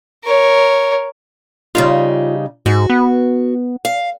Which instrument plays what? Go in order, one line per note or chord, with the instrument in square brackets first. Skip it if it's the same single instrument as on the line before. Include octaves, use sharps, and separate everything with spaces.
[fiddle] A#4 C#5
[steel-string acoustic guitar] C#3 G3 D#4 [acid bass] F4
[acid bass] G#2 [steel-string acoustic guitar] F#4
[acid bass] B3
[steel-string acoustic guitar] F5